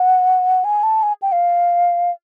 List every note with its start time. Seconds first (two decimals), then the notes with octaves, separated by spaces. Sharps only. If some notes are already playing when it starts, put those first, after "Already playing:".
Already playing: F#5
0.64 G#5
0.83 A5
1.03 G#5
1.22 G5
1.32 F5